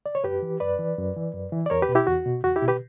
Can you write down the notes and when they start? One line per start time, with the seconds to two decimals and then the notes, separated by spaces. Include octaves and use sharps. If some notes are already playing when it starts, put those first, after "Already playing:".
0.06 D5
0.15 C#5
0.24 F#2 G4 B4
0.42 E3
0.60 F#2 B4 D5
0.79 E3
0.98 F#2
1.16 E3
1.33 F#2
1.52 E3
1.66 D5
1.70 E2 A#4 C#5
1.82 G4 B4
1.89 B2
1.95 E4 G4
2.07 E2 F#4
2.26 B2
2.43 E2 F#4
2.56 E4 G4
2.62 B2
2.68 G4 B4